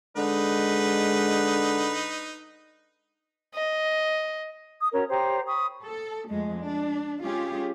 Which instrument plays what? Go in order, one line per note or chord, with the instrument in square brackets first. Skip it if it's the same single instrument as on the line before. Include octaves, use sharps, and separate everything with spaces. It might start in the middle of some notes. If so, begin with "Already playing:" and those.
[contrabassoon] D3 [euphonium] G#3 [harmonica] D#4 B4
[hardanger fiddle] D#5
[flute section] D#6
C#4 F#4 A#4 C#5
G4 C5 C#5 A#5
B5 C#6 D#6
[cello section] A4
F2 G#3 A3
D4
G#3 C#4 F4 G4 G#4